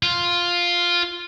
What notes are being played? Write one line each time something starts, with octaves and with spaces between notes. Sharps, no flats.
F4